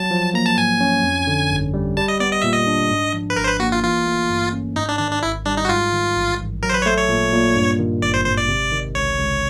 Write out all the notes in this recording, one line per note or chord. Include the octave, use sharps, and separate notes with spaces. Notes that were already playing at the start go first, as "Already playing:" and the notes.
Already playing: F#3 A5
F3
A#3 A#5
A5
G#2 G#5
C#4
F2
D3
G1
G3
G3 A5
D#5
B3 D5
D#5
A#2 E5
D#5
D4
G#2
F3
B4
G#1 A#4
C5
B4
A#3 F#4
F4
E3 F4
A3
G2
C#4
G#2 D#4
D4
D#3 D4
D4
G#1 E4
G3 D4
D#4
F#4
G#2 F4
D#3
A1
A1
F#3 A#4
C5
B4
C#5
A3 C5
C#5
A#2
A#2
G2
D#3
G#1 D5
C5
G#1 C5
D5
C3
D#3
C#2 C#5
C#2